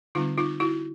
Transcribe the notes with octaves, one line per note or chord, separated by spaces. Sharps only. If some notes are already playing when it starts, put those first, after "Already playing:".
D3 G3 C4 D#4 F4
D#4 F4
E4 F#4